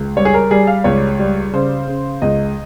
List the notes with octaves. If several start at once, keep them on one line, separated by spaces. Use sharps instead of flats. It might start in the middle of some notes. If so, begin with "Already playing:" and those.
Already playing: C#2
G3 C#5
G#4
A#4
G3 G#4
F5
C#2 C#5
G3
C#3 C5
C#3
C#2 D#5